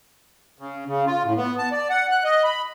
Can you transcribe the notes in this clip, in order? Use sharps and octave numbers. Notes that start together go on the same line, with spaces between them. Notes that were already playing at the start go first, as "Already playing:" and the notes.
C#3
C#3
F4
A2
B3
A5
D5
F#5
F#6
D#5
B5